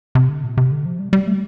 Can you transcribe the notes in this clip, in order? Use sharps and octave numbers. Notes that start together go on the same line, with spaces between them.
C3
D3
A#2
C3
D3
F3
G3
G3
A3